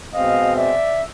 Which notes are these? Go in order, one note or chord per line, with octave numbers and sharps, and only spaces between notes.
B2 G#3 C4 D#5 F5
D5 E5